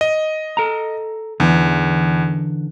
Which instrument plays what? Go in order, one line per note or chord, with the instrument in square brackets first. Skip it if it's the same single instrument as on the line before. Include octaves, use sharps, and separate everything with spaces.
[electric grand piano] D#5
[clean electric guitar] A4 A#5
[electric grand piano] E2 [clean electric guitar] D3 E3